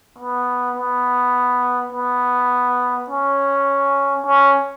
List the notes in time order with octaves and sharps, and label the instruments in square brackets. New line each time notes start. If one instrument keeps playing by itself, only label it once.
[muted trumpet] B3
B3
B3
C#4
C#4